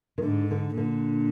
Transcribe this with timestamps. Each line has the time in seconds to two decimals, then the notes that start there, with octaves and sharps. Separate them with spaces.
0.18 D#3
0.22 G#2 D3
0.51 D3
0.77 A#2 D3